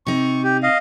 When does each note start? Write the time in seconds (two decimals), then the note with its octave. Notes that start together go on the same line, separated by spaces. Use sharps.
0.07 C3 D#4 C#6
0.44 G4
0.63 D#5 F5